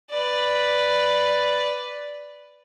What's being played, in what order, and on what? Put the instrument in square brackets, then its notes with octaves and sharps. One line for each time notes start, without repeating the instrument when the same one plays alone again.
[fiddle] B4 D5